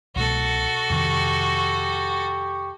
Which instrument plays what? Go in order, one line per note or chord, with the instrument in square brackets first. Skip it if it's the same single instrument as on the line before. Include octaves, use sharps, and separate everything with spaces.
[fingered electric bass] C2 B2 A3 [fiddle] F#4 A4
[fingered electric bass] F2 C3 D#3 [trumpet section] G4 C#6